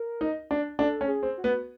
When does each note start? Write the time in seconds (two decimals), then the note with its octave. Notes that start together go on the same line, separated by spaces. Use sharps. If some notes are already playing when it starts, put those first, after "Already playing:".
Already playing: A#4
0.21 D#4
0.51 D4
0.78 D4 A4
1.01 C#4
1.08 G#4
1.23 C4
1.38 F#4
1.44 B3